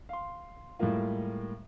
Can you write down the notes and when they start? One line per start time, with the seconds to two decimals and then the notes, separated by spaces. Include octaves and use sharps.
0.09 F5 C6
0.79 A2 G3 G#3 A#3 F4